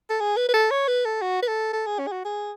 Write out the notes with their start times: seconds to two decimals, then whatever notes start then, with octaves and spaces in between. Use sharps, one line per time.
0.10 A4
0.20 G#4
0.37 B4
0.49 B4
0.54 A4
0.71 C#5
0.88 B4
1.05 A4
1.22 F#4
1.42 B4
1.48 A4
1.73 A4
1.86 G#4
1.99 C#4
2.07 G#4
2.12 F#4
2.25 G#4